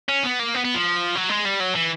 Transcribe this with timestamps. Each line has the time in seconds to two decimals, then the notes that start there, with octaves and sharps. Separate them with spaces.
0.09 C#4
0.24 B3
0.39 A#3
0.54 B3
0.65 B3
0.74 F3
1.15 F#3
1.29 G#3
1.45 G3
1.60 F#3
1.75 E3